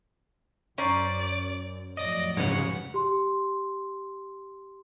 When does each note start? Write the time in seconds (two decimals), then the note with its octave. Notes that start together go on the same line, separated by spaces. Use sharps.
0.78 F#2 C#4 C5 D5 A#5
1.97 F2 A2 F#3 D5 D#5 A#6
2.37 G#2 C#3 B4 C#5 F#5
2.94 G4 C6